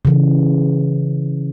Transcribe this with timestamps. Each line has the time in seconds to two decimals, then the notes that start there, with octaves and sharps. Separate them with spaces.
0.05 C#3 E3